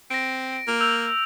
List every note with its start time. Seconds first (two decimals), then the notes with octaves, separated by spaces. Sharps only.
0.10 C4 A#6 D7
0.68 A#3
0.80 E6 G6 F7